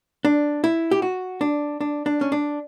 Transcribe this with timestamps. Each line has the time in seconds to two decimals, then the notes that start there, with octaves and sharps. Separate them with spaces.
0.25 D4
0.64 E4
0.91 G4
1.02 F#4
1.41 D4
1.81 D4
2.06 D4
2.21 C#4
2.32 D4